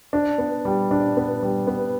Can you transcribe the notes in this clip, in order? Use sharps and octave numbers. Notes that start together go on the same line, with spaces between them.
D4
B3
G3
D4
B3
G3
B3